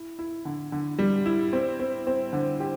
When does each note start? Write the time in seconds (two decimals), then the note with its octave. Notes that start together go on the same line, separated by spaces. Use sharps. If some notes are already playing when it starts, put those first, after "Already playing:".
Already playing: E4
0.19 E4
0.45 D3
0.72 D3
0.99 G3
1.26 E4
1.53 C4
1.79 C4
2.07 C4
2.33 D3
2.60 G4